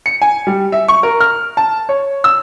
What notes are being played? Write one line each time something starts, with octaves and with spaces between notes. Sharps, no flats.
C#7
G#5
G3
E5
C#6
A#4
F6
A5
C#5
E6